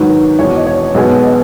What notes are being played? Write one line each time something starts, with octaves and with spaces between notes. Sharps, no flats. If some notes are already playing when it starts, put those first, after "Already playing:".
Already playing: G#2 D#3 F#3 B4
E1 E2 B2 C#5
D#5
C#5
B1 B2 G#3 B3
D#5